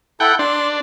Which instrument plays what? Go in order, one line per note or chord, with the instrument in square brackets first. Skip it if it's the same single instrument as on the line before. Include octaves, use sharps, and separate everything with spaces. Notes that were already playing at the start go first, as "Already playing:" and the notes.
[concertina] E4 A4 [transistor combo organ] F#5 G5
[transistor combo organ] D4 [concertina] C6